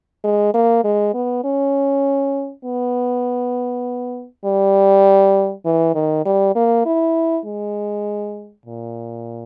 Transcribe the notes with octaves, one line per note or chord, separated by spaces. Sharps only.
G#3
A#3
G#3
B3
C#4
B3
G3
E3
D#3
G3
A#3
E4
G#3
A#2